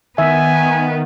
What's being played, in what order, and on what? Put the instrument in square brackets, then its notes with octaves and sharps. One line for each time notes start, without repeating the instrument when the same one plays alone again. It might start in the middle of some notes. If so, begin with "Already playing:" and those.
[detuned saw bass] D#3 [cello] B3 [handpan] E5 [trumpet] G#5